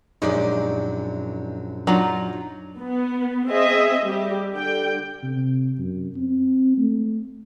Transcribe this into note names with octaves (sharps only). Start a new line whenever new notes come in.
A#1 F#2 G#3 D#4 G4 D5
F#3 D4 D#4 F4
B3
C4 G#4 D#5 E5
G3 G4
D3 G3 G5
C3
F#2
C4
A3